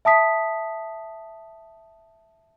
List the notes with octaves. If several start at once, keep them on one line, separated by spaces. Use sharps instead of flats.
E5 A5 D#6 B6